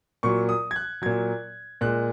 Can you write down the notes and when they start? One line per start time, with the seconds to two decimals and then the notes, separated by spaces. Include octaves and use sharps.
0.23 A#2 F#3 C#6
0.49 D#6
0.71 G#6
0.76 F#6
1.02 A#2 F#3 G#6
1.81 A#2 G#3 F#6